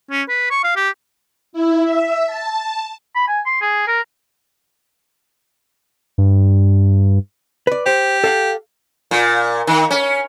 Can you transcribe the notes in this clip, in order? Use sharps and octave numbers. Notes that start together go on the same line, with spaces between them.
C#4
B4
C#6
F5
G4
E4
E5
A5
B5
G#5
C6
G#4
A#4
G2
B4 D5
G4 C5
A4 F5 F#5
A#2
D#3
C#4